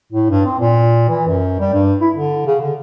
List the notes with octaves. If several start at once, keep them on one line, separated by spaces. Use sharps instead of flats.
A2
G2
C4
A#2
E3
F#2
G3
G2
E4
D3
C#3
D3